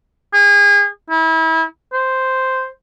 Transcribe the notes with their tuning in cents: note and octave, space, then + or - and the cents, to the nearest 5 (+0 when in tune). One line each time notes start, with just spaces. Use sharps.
G#4 -35
E4 -30
C5 -5